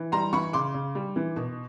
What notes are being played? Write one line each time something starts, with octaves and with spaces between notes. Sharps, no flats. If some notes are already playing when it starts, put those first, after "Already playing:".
Already playing: E3
G3 A#5 C6
E3 B5 C#6
C#3 C6 D6
C#3
G3
E3
B2